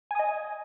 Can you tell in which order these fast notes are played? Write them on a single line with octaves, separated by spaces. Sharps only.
G#5 D#6 D#5